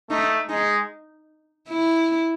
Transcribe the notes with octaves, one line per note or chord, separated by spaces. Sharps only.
A3 D#4
G#3 D#4
E4